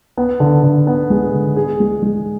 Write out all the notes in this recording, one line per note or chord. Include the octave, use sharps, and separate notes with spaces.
B3
D3
D3
B3
G#3
D3
G#4
G#3
G#3